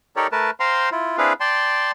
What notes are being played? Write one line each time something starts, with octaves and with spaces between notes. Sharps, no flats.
D#4 G4 A4 A#4 C#5 D5
A3 A#4 B4 A5
C5 F5 G5 A#5 C6
E4 F4
C4 D4 E4 G#4 B4 F5
D5 G5 A5 C6